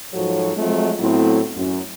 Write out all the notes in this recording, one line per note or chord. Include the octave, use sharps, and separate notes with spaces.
G#2 F3 F#3 F#4 A4 C#5
F3 F#3 G#3 A3 C4 F4
A2 F#3 A3 B3 C4 E4
F#2